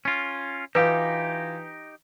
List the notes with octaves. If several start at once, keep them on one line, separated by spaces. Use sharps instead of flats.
C#4 F4
E3 D#4 F4 G4 B4